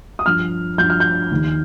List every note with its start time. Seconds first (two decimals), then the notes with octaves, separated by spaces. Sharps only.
0.19 D#6
0.25 G2 F3 F6
0.78 G2 F3 G6
0.90 F6
1.00 G6
1.31 D#2 D#3